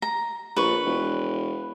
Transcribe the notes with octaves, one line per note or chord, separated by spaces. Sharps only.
A#5
A#1 B4 C#6
E1